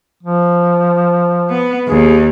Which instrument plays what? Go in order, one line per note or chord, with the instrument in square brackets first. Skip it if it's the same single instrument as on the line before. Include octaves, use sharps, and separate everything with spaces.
[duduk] F3
[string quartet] B3
[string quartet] D#2 [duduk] G#4